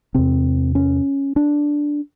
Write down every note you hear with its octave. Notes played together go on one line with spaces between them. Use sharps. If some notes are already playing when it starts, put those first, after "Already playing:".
E2 C3 C4
C#4
D4